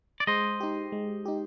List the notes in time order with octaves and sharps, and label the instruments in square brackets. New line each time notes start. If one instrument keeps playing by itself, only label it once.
[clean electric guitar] D5
[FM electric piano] G#3 [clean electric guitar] C5 D#5
[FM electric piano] D#4 G4
G#3
D#4 G4